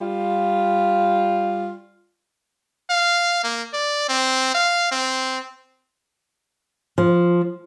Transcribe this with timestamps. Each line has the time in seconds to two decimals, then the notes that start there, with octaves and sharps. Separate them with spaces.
0.01 G3 F4
2.90 F5
3.44 A#3
3.73 D5
4.09 C4
4.55 F5
4.92 C4
6.98 F3